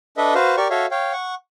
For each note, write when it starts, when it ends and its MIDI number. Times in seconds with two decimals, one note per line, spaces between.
0.17 0.34 62
0.17 0.34 69
0.17 0.34 71
0.17 0.34 75
0.17 0.34 76
0.35 0.56 66
0.35 0.56 71
0.35 0.56 72
0.35 0.56 77
0.57 0.68 67
0.57 0.68 70
0.57 0.68 74
0.57 0.68 85
0.70 0.86 66
0.70 0.86 69
0.70 0.86 73
0.70 0.86 76
0.70 0.86 77
0.91 1.13 73
0.91 1.13 77
0.91 1.13 79
1.13 1.35 78
1.13 1.35 85